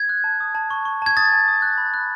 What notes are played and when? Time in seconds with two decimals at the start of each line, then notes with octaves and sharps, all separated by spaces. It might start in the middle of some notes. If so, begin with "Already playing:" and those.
Already playing: G#6
0.09 F#6
0.24 A5
0.40 D#6
0.55 A5
0.71 C#6
0.85 C#6
1.02 A5 G#6
1.17 D#6 A6
1.32 G#5
1.48 D#6
1.62 F#6
1.78 B5
1.94 F#6